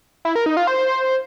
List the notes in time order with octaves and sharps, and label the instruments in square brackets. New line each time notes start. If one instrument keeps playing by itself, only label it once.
[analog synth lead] E4
A#4
D#4
F4
C5